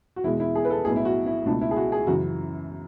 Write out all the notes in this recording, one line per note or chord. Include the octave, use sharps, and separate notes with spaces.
F#4
E2 B2 G#3 E4
E4
G#4
B4
A4
B1 A2 G#3 B3 G#4
E4
F#4
E4
C#2 B2 A3 D4
E4
G#4
F#4
G#4
F#2 C#3 E3 F#4